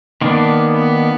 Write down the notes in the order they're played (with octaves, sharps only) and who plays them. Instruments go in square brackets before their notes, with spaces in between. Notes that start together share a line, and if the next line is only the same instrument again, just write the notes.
[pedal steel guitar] D#3 A#3 D4 [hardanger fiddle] B3
[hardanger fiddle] B3